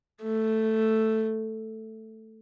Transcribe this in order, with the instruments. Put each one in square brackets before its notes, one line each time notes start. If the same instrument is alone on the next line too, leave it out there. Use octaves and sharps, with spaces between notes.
[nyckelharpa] A3